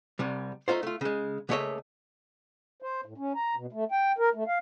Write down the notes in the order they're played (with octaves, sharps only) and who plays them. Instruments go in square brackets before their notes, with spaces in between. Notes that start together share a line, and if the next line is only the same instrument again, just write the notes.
[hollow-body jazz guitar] C2 C3 G3
A3 D#4 F4 C5
A3 F4
C#3 G#3
C#2 A3 A#3 C#5 D#5 E5
[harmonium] C5
A2
C#4
A#5
B2
A3
G5
A#4
A3
F5